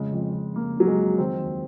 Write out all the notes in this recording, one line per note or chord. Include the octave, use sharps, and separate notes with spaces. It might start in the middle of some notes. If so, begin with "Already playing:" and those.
Already playing: F2 C#3 G#3
F2
F2
C#3 A#3
C#3 F#3
G#3
F2
D#3 C4
D#2